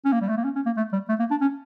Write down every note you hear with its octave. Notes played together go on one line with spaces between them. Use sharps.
C#4
A#3
G3
A3
A#3
C#4
C#4
A#3
A3
G3
A3
A#3
D4
C#4